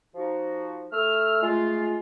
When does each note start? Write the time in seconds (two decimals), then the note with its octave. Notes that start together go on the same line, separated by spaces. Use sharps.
0.14 F3 D#4 F#4
0.91 A3 E6 F6
1.42 G#3 A3 F4